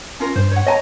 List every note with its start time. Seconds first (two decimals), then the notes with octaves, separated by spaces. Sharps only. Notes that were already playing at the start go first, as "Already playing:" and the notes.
0.20 C#4 F4 A#4
0.36 G2 C5
0.52 C#5 F#5
0.67 C#5 D#5 G#5 A#5